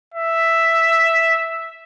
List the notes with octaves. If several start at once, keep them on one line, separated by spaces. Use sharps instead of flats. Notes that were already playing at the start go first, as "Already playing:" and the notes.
E5